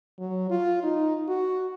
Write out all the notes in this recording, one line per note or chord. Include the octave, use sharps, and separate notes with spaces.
F#3
F4
D#4
F#4